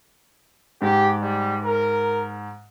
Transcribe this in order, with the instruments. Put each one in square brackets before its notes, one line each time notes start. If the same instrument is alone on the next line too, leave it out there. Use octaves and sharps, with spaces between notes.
[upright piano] G#2 [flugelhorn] G4
[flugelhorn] G3
A#4